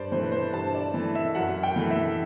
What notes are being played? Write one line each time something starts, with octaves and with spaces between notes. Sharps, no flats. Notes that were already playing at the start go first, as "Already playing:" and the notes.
Already playing: G2 C5 D5
E3 A3 C5
B4
C5
G2 A5
D5
E3 A3
E5
F#2 F#5
G5
E3 A3
E5